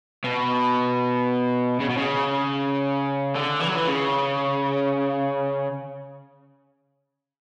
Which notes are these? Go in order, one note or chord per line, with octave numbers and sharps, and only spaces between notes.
B2
C#3
B2
C#3
D3
E3
F#3
E3
C#3